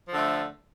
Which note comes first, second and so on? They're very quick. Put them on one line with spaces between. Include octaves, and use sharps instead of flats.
F3 D3 A3